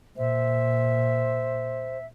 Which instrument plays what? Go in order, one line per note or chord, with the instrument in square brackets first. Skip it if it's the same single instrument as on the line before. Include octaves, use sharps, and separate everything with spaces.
[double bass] A#2 [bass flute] C5 [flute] E5